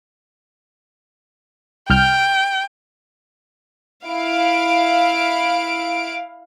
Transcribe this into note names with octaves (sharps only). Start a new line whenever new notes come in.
C2 G5 F6 G6
E4 F5 D7